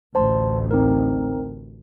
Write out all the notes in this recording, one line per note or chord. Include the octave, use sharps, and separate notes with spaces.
A1 D2 C5 A5 C6
C4 D#4 A#4